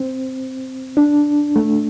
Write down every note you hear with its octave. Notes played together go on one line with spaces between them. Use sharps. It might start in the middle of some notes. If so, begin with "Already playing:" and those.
Already playing: C4
D4
A3